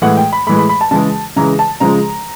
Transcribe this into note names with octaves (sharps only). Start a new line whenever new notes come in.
A2 E3 G#3 F#5
G5
B5
A2 E3 G#3 B5
B5
B5
A5
C#3 E3 G#3 A5
C#3 E3 G#3 A#5
A5
C#3 F3 G#3 A#5